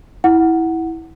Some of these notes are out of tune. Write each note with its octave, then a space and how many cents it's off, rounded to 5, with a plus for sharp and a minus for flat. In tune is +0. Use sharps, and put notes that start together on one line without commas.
E4 -10 F#5 +0